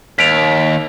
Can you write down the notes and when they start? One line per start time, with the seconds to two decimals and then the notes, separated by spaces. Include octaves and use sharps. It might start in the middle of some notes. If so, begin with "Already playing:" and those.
0.19 D#2 B6 D7 F7